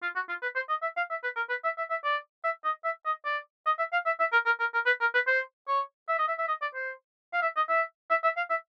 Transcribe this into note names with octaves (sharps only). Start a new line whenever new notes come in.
F4
F#4
F4
B4
C5
D#5
E5
F5
E5
B4
A#4
B4
E5
E5
E5
D5
E5
D#5
E5
D#5
D5
D#5
E5
F5
E5
E5
A#4
A#4
A#4
A#4
B4
A#4
B4
C5
C#5
E5
D#5
E5
E5
D#5
D5
C5
F5
E5
D#5
E5
E5
E5
F5
E5